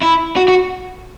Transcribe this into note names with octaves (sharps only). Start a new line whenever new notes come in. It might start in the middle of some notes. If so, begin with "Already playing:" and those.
E4
F#4
F#4